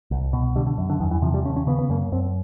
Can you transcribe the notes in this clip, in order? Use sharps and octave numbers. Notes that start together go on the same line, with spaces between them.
C2
B2
D3 G3
D3
F#2
D3
E2 D#3
E3
C3 F3
G3
D#2 C#4
C#4
C#3 B3
B3
F#2 A#3
F#2 C4